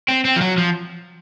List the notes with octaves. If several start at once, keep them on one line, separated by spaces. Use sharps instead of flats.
C4
C4
F3
F#3
F3